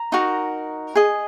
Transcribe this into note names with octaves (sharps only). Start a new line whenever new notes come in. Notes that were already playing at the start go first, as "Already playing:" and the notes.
Already playing: A#5
D#4 F#4 A#4
G#4 D#5